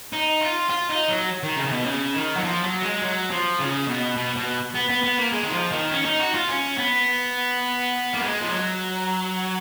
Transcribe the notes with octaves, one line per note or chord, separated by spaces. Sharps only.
D#4
F4
F4
D#4
F#3
D#3
C#3
C#3
B2
C#3
D#3
F#3
F3
F#3
G#3
F#3
F3
C#3
B2
B2
B2
B3
B3
B3
A#3
G#3
D#3
F3
D#3
C#4
D#4
F#4
F4
C#4
B3
A#3
G#3
F3
F#3